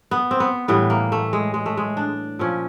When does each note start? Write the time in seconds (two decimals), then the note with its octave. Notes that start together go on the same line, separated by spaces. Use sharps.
0.11 B3
0.31 C4
0.40 B3
0.68 A2 E3 G3 B3
0.90 A#3
1.12 A3
1.33 G#3
1.54 G#3
1.66 A3
1.77 G#3
1.97 D4
2.39 A#2 F3 C#4